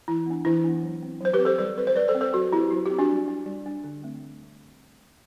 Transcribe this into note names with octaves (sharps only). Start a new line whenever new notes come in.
E3 E4
B3 D4
E3 E4
B3 D4
F#3
C4
F#3 C5
G4 B4
C4
A4 C5
G3 A4 C5
C4 B4
C5
G3 B4 D5
A4 C5
C4
A4 C5
F#3 F#4 A4
C4 E4 G4
F#3 F#4
C4 G4
D4 F#4
G3
D4
G3
D4
D3
A3 C4